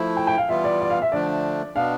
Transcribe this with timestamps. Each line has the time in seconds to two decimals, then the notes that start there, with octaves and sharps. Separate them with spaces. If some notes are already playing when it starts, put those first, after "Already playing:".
Already playing: F3 A3 E4
0.17 G5
0.27 G5
0.38 F5
0.49 E3 G3 B3 F4 E5
0.64 D5
0.81 D5
0.90 F5
1.02 E5
1.12 D3 F3 A3 D4 D5
1.75 B2 B3 D4 F5